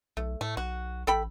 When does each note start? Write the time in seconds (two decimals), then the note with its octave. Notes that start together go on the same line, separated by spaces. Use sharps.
0.17 B1 A3
0.41 A2 A3
0.57 B1 F#4
1.07 A1 A4 G5 B5